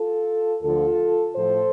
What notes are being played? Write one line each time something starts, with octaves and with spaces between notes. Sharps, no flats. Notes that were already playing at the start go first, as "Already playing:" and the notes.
Already playing: F4 A4
D2 D3 F3 F4 A4
A2 F3 A4 C5